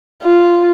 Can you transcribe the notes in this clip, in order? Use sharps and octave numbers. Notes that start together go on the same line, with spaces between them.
F4